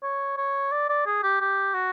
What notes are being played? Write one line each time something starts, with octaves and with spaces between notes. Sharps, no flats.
C#5
C#5
D5
D5
G#4
G4
G4
F#4